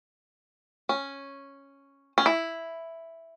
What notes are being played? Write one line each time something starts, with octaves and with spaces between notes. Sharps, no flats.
C#4
C#4
E4